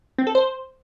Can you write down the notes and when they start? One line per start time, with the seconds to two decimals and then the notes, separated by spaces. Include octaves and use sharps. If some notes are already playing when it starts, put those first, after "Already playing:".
0.18 C4
0.27 A4
0.35 C5